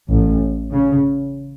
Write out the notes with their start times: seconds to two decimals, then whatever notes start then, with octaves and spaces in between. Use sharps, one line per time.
0.10 A1 A2
0.72 C#3